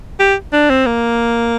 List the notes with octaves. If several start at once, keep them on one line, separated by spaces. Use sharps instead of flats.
G4
D4
C4
A#3